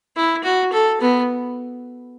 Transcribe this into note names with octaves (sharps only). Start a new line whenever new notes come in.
E4
F#4
A4
B3